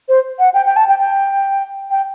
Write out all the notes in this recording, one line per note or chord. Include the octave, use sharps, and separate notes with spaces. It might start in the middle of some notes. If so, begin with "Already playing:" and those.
C5
F#5
G5
G5
A5
G5
G5
G5